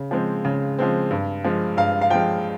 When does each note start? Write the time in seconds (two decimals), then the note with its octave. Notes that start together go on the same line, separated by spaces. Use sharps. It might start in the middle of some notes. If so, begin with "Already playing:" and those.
Already playing: C#3
0.11 F3 G#3 C4
0.45 C#3
0.78 F3 G#3 C4
1.11 G2
1.44 F3 G#3
1.77 G2 F5
2.01 F5
2.10 F3 G#3 G5